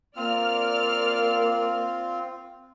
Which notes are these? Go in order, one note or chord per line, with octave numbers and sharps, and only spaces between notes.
A#3 C4 F4 D5 F6